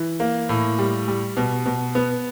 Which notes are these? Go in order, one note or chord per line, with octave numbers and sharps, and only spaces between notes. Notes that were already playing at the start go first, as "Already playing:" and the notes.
Already playing: E3
A#3
A2
G3
G3
B2
B2
B3